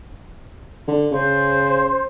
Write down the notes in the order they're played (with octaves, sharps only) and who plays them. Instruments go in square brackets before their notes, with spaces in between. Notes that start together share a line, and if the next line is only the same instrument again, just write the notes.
[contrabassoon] D3
[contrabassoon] C#3 [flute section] C5